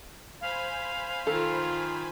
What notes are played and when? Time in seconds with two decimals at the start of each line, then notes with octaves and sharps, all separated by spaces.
0.41 C5 F5 G#5 B5
1.27 D#3 F4 A4